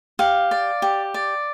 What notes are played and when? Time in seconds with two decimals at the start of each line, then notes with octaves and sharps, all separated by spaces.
0.19 G4 F5
0.51 D5
0.82 G4
1.14 D5